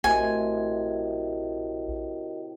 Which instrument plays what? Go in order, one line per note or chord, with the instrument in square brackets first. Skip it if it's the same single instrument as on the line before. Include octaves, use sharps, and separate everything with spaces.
[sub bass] A#1 [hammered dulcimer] A2 C3 [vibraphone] F#4 A#4 D#5 [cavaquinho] G#5